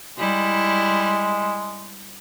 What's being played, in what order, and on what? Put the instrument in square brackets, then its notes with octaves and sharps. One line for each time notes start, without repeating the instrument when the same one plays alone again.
[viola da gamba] G3 E4 [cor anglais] G#3